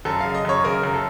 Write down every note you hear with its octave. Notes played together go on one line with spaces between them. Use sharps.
F#2 A4
C#3 F5
D#5
F#2 C#5
C#3 A#4
F#2
A4